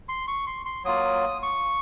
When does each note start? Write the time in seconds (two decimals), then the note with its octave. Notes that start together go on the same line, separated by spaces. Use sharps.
0.09 C6
0.28 C#6
0.47 C6
0.66 C6
0.85 F#3 A#3 F4 D#6
1.43 C#6